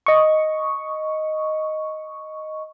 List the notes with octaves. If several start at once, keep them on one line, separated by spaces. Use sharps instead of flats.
D#5 C#6